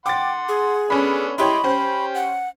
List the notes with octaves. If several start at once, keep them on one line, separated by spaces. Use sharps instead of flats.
F#5 G5 C6 D6 A6
G#4
B3 C#4 D4 A4 B5
E4 G4 C#5 D#5 B5 C6
C#4 G4 C5
F#5